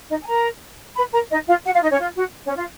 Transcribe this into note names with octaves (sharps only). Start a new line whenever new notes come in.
D#4 D#5
G#5
A#4 A#5
B4 B5
A#4 A#5
D#4 D#5
F4 F5
F#4 F#5
F4 F5
D#4 D#5
C#4 C#5
F4
F#4
C#4 C#5
F4 F5